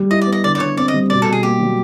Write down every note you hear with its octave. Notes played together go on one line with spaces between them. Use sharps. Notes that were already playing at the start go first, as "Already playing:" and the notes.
Already playing: G3 G4
E4 D#5
D5
B3
D#5
D3 D5
D5
D3 C#5
C4 D5
D#5
G3
B2 D5
B2 A4
G#4
A#3 G4
F#3